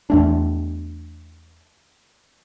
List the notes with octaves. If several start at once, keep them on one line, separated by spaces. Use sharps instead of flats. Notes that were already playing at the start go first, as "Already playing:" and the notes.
E2 A3 D4